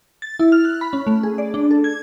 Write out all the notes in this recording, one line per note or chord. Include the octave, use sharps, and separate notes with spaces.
A6
E4
F6
F#6
B5
C#4
A3
G#4
D5
D4
A4
G#6